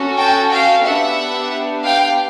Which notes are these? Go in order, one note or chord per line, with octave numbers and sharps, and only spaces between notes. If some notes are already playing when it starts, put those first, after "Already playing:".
Already playing: C#4 F#4 A4
G5 A5
F5 G5
B3 D4 G4 E5 F#5
F5 G5